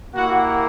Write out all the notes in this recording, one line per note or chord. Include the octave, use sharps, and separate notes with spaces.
A#3 E4 F#4 G4 F#5